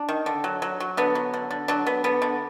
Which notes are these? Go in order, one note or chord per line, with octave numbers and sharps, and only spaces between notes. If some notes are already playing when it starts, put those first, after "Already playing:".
Already playing: D4
D#3
D3
F#3
F#3
F#3
D3 B3
F#3
D3
D3
F#3 D4
B3
D3 B3
D3